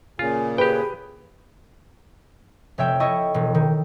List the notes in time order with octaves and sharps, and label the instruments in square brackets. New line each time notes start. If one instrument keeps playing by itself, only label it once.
[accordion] A#2 C#3 [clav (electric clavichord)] F4 [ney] G#5
[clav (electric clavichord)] G4 G5 [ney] G#4 [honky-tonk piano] B4
[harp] F1 C#5 E5 G5
E4 A4 D#5 C#6
E1
D#3